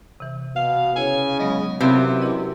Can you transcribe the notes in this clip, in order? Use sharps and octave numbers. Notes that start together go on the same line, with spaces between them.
C3 E3
B2 F5
C#3 E4 C#5 G#5
F#3 G#3 B3 D#5
F#2 C3 E3 F5 B5
E4 A#4 D#5